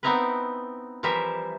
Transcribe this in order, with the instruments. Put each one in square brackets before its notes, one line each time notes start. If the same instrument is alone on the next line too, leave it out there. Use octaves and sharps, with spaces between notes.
[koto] B3 C4 D#4 E4 A#4 B4
E3 F3 G3 A#4 C5 E5